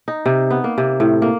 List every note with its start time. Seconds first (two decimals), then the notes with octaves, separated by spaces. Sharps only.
0.08 D#4
0.26 C3
0.51 B3
0.64 A#3
0.78 C3
1.00 A2
1.22 A#3